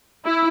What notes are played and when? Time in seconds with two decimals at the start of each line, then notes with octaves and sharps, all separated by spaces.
0.25 E4